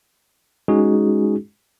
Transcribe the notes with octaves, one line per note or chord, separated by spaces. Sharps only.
G#3 C#4 D#4 F#4 G#4